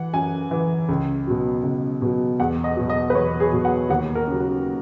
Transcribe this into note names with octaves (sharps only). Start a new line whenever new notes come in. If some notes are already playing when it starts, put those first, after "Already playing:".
Already playing: E3 F#5
F#2 G#5
E3
C#2
B2 F#3
C#2
B2 F#3
E2 F#5
D#5
B2 F#3
D#5
B4
E2 C#5
G#4
B2 F#3
F#5
D#2 F#5
A#4
C#3 F#3
F#4